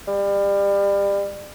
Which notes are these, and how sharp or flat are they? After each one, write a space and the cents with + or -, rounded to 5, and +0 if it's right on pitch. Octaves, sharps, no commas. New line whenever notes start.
G3 +30